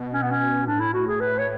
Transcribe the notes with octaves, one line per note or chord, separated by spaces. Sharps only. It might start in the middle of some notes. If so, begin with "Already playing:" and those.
Already playing: B2
C#4
B3
C#4
A2 D4
E4
F#4
G#4
B4
C#5